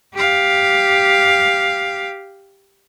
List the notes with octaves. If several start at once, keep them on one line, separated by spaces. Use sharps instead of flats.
G4 F5